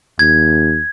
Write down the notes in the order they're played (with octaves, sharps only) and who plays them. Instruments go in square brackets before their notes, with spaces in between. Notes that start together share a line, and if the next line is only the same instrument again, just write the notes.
[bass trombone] D#2 [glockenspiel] G#6